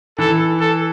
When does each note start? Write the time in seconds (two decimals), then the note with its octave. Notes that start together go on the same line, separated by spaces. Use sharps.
0.18 E3 A4
0.60 A4